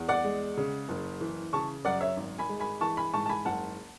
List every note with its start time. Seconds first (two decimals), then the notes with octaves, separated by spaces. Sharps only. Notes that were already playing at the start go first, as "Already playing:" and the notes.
Already playing: E2
0.09 D5 F#5
0.24 G#3
0.57 C#3
0.89 F#1
1.21 E3
1.53 C#3 A5 C#6
1.85 F#2 D5 F#5
2.01 C#5 E5
2.17 G#1
2.38 G#5 B5
2.49 G#3
2.60 G#5 B5
2.81 E3 A5 C#6
2.97 G#5 B5
3.13 G#2 A5 C#6
3.26 A5
3.29 G#5 B5
3.45 F#1 F#5 A5